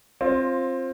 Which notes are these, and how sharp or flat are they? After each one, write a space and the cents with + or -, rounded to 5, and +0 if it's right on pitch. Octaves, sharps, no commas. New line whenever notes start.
C4 +20 F4 +0